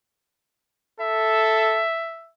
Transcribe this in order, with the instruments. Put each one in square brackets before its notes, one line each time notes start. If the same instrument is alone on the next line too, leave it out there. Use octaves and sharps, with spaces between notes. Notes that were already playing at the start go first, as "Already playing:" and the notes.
[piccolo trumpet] A4 [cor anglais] E5